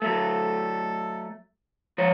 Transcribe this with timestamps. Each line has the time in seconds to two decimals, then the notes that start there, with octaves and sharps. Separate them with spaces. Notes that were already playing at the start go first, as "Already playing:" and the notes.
0.02 F#3 A3 A4
1.98 F3 C#5